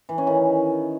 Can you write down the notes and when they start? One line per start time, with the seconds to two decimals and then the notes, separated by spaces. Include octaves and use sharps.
0.09 E3
0.18 C#4
0.27 D#3